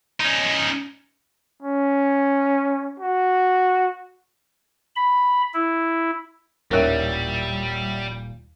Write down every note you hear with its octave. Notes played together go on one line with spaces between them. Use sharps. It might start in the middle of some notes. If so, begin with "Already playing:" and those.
C#4 D#4
C#4
F#4
B5
E4
D#1 A1 D#2 A#2 G3 A#4 C#5 E5